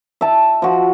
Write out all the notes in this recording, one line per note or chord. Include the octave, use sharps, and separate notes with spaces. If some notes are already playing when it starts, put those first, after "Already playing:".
E5 A5
F3 F#4